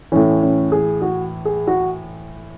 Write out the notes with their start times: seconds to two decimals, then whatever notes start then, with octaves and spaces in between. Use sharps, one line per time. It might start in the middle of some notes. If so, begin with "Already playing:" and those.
0.12 A2 E3 C#4
0.43 C#4
0.72 G#4
1.02 F#4
1.45 G#4
1.68 F#4